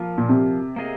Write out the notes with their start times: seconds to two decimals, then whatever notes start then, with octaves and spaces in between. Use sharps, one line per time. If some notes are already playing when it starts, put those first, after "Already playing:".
Already playing: F3 A#3 F4
0.18 A#2
0.29 C3
0.76 A#3 G#4 D#5